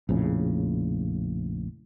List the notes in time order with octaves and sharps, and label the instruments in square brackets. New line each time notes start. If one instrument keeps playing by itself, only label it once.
[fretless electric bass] A#1 F2 A2 C#3